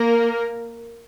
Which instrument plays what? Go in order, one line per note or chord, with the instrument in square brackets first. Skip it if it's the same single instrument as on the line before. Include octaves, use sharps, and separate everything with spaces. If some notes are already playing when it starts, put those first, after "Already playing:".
Already playing: [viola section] A#3 A#4